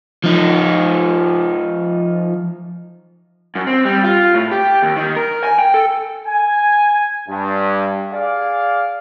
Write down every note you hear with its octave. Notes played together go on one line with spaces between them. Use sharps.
F3 D#4
F#2
C4
G3
F4
A2
G4
D#2
D#3
A#4
G#5
G5
A4
G#5
G2
G#4 D5 F5